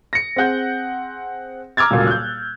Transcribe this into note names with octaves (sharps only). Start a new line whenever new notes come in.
A#6 C#7
C4 G#4 F#5 G6
A#5 D6 E6 F6 G#6 A6
D#1 C#2 A#2 F#3
F#6 G6